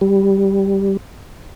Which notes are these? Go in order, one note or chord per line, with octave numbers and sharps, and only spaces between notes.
G3